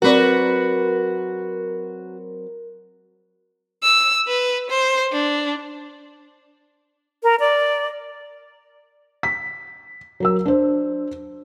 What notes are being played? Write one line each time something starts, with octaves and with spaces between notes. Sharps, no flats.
F#3 C4 F#4 A#4 B4 D5
E6
B4
C5
D4
A#4
D5
B6
F#3 A#4 E6
D4 C5